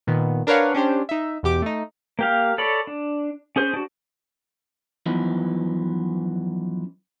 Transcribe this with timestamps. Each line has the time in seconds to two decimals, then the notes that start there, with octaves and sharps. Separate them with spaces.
0.07 A#2 D#3 B3
0.47 D4 A#4 B4 C#5 F5 F#5
0.74 C#4 D4 G4 C5
1.09 D#4 E5
1.43 E2 B2 G4 D6
1.62 A3 D#4
2.19 A#3 G4 F5
2.58 A4 C#5 D5 B5
2.87 D4
3.56 C#4 G#4 C5
3.74 D4 F#4
5.06 F#2 E3 F3 B3 D#4